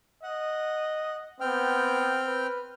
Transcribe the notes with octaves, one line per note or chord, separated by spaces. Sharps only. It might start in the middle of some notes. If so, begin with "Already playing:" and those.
D#5 F#5
B3 C4 G5 F6
B4